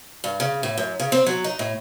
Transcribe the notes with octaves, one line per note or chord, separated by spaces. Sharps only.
G2
C#3
A2
F#2
C#3
C4
F#3
D#4
A2